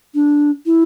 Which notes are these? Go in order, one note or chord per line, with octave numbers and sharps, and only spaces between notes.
D4
E4